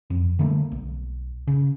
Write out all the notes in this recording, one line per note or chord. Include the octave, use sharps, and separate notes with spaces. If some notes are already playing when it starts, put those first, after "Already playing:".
F2
D3 G3 A3 A#3
B1
C#3